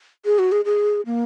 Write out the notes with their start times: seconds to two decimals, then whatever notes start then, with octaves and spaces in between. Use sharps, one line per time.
0.25 G#4
0.39 F#4
0.52 G#4
0.65 G#4
1.06 A#3